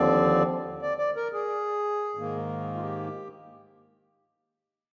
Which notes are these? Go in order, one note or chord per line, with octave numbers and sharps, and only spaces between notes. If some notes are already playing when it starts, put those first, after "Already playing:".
Already playing: D#2 D3 F3 C4 D5
D5
D5
A#4
G#4
G#2 D#3 A#3
F4
G4